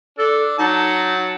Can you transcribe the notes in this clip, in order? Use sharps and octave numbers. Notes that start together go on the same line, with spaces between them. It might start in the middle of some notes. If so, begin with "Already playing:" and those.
D4 A4
F#3 D#4 F#5 A5